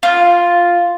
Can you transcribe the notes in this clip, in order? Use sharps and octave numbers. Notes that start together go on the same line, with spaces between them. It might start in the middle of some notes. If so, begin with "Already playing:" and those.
F4